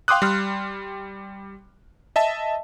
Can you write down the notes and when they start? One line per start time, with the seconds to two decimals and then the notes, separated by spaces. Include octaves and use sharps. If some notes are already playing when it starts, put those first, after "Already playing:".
0.08 F5 G5 C6 D6 D#6 F#6
0.22 G3 C6 F6
2.16 D#5 E5 A5